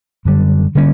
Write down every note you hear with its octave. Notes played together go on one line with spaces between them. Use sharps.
F#2 D3 G3
D3 G3 A#3 C#4